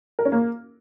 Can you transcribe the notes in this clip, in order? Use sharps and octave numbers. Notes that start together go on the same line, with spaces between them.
A#4
C#4
A#3